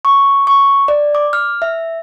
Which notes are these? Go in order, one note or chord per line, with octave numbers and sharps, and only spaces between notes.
C#6
C#6
D5
D6
F6
E5